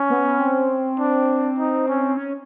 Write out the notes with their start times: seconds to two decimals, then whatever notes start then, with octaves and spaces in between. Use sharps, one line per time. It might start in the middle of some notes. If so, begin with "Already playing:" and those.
Already playing: C#4
0.10 B3
0.39 C4
0.99 D4
1.58 D#4
1.88 C#4
2.17 C#4